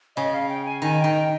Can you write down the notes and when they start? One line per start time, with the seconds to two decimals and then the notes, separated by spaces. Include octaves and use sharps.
0.16 C#3 D#5
0.33 F5
0.49 G5
0.65 G#5
0.82 D#3 G#5
0.99 D#3 G5
1.15 G5